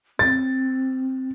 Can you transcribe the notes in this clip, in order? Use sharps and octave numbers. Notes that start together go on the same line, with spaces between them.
C4 A6